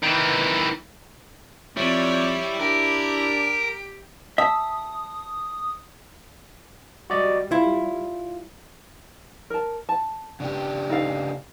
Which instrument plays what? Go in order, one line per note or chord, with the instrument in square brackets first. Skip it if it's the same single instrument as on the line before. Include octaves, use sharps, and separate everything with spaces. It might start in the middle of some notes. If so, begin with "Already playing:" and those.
[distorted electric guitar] D#3 E3
[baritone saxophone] F2 [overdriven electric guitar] G3 [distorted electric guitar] E4 [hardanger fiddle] C#5 D5
[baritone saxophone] D4 [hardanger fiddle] G4 [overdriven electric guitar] A#4
[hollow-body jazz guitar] E5 [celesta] A5 B6 [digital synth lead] D#6
[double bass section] G3 [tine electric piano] F#4 D5 D#5
[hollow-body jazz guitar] E4 [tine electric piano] F4
[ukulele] A#4 A5
A5
[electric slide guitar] C#3 D4 G4
[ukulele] D#4 A4 F5